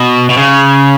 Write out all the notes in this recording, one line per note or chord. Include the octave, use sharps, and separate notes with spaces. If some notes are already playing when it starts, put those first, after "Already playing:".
Already playing: B2
B2
C#3